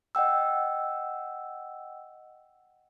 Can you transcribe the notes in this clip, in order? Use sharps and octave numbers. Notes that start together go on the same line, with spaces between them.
D#5 F#5 G5 E6